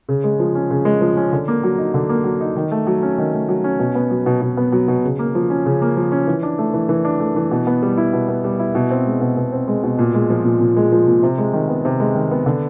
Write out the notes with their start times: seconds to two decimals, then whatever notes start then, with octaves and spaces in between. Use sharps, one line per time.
0.09 C#3
0.24 G#3
0.39 F3
0.55 C#4
0.70 C#3
0.85 G#3
1.01 F3
1.17 C#4
1.33 D3
1.48 A#3
1.63 F#3
1.78 D#4
1.94 D3
2.09 A#3
2.24 F#3
2.40 D#4
2.57 D#3
2.72 A3
2.87 F#3
3.03 C#4
3.18 D#3
3.34 A3
3.49 F#3
3.64 C#4
3.79 B2
3.95 B3
4.11 F#3
4.26 B2
4.41 B2
4.57 B3
4.72 F#3
4.88 B2
5.04 C#3
5.19 A#3
5.35 F3
5.50 C#4
5.66 C#3
5.82 A#3
5.97 F3
6.12 C#4
6.27 E3
6.43 D4
6.58 A3
6.74 E3
6.89 E3
7.05 D4
7.20 A3
7.36 E3
7.51 B2
7.67 B3
7.82 G3
7.98 E4
8.13 B2
8.29 B3
8.44 G3
8.59 E4
8.75 B2
8.91 C4
9.06 G#3
9.21 B2
9.37 B2
9.52 C4
9.68 G#3
9.84 B2
9.99 A#2
10.14 G#3
10.30 F3
10.45 A#2
10.60 A#2
10.76 G#3
10.92 F3
11.07 A#2
11.23 C3
11.38 G#3
11.53 D#3
11.69 B3
11.85 C3
12.00 G#3
12.15 D#3
12.31 B3
12.46 D3